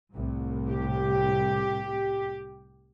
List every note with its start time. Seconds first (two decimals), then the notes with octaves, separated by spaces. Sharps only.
0.12 C2 A2
0.69 G4